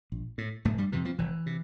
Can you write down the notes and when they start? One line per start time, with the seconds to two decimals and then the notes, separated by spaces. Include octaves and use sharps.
0.12 A#1
0.38 A2
0.65 F1 A2 A3
0.78 G2 G3
0.92 F2 C3 E3
1.05 F2 F3
1.19 F1 E3
1.46 C3